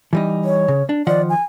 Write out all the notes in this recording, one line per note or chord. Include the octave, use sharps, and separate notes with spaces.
E3 G3 D#4
C#5
C#3
D4
D#3 F3 D5 F#5
G#5